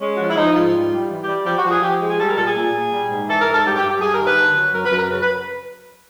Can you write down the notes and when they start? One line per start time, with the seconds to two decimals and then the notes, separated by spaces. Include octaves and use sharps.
0.01 G#3 C#4
0.15 F#4
0.19 F3 F4
0.30 E4
0.37 F3 D#4
0.56 G#2 F4
0.75 G3
0.92 G3
1.11 E3
1.23 G4
1.28 G3
1.46 F3 G4
1.58 F#4
1.65 F3
1.71 G#4
1.83 F3 G4
2.01 G#3
2.08 G#4
2.20 G3 A4
2.28 A#4
2.37 A#2 A4
2.46 G#4
2.56 A#2
2.74 A#2
2.93 G3
3.10 G#2
3.28 E3 A4
3.40 A#4
3.47 G#2
3.53 A4
3.65 G2 G4
3.76 G4
3.83 G2
3.89 G4
4.01 G2 G#4
4.13 A#4
4.19 D#3
4.25 B4
4.37 D3
4.56 F#3
4.73 F#2 A#4
4.85 B4
4.92 F#2
4.99 A#4
5.10 C#3 B4
5.22 B4